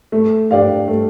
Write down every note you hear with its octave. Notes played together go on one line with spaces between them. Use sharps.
A3
D4 G4 D5 F5
A3